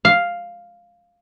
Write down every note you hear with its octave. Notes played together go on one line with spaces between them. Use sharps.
F5